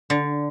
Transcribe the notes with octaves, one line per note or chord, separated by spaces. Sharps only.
D3